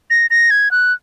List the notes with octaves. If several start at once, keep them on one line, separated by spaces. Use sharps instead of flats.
A#6
A#6
G#6
F#6